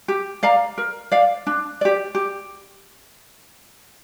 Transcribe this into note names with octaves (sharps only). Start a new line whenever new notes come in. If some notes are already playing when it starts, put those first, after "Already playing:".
G4
D5 F5 A#5
A#4
D5 F5
D4
G4 D5
G4